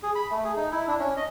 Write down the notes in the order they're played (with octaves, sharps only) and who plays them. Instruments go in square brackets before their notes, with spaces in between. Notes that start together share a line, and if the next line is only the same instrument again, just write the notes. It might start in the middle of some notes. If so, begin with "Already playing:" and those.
[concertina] G#4
B5
A3
G#4
D#4
E4
D4
C#4
D#5